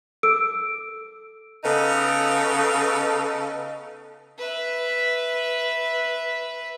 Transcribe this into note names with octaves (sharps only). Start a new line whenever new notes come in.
A4 E6 D7
C#3 B3 D#4 A4
B4 E5